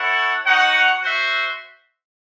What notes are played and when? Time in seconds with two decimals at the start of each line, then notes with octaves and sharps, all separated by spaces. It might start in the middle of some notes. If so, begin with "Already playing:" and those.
Already playing: E4 A4 C#5 F#5
0.45 D#4 F#4 C#5 F#5
1.00 F#4 C5 E5